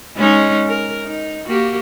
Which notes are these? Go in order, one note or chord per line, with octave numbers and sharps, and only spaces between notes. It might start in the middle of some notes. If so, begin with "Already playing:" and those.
G#3 C#4 D#4
A#4
D#4
A#3 F#4 G4